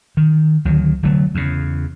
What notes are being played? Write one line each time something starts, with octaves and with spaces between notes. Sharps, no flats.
D#3
D2 D#3 F#3
F1 D3 F#3 A3
E2 C#3